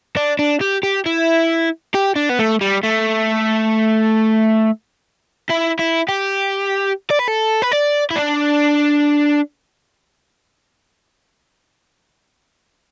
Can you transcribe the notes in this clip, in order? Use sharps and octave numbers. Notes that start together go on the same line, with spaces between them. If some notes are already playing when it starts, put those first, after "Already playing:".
D4
D4
G4
G4
E4
G4
D4
B3
A3
G3
A3
E4
E4
G4
D5
B4
A4
B4
D5
E4
D4